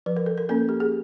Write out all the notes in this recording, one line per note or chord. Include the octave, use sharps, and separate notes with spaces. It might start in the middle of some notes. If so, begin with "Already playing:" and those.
F3 B4
A#4
A4
A#4
A#3 C#4 A4
G4
G#4